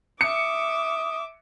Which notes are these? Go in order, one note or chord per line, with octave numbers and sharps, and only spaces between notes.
E5 D6 D#6 C#7